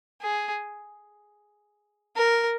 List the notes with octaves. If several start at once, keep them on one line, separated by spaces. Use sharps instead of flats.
G#4
A#4